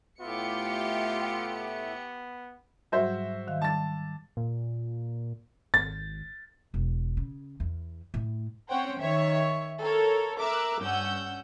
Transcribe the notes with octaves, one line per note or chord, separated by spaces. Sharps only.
A2 A3 B3 F4 G4 E5 C#7
G#2 F#3 G3 F#4 C5 E5
D#3 F5
G3 A5 A6
A#2
G#1 A6
E1
C#3
E2
A2
C4 C#4 C5 C#5 F#5 G5
D#3 C#5 E5
A4 A#4 C#5
A#4 E5 D6 E6 F#6
G2 C#4 F#5 E6 G6